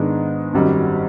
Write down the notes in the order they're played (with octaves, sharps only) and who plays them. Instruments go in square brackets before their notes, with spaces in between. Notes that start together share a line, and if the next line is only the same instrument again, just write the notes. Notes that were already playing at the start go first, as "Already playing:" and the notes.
Already playing: [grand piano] G#2 D#3 G#3 B3 D4
G#1 F#2 D#3 G3